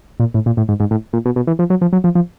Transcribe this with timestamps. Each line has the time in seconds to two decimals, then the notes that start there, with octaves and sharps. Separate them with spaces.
0.20 A#2
0.34 A2
0.46 A#2
0.57 A2
0.69 G#2
0.80 G#2
0.91 A2
1.13 A#2
1.26 B2
1.36 B2
1.47 E3
1.59 F3
1.70 F#3
1.82 F3
1.93 F#3
2.04 F3
2.15 F3